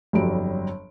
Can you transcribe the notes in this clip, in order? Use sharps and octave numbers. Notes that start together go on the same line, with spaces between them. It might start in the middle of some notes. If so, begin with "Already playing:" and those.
G1 F2 F#3 G3 D7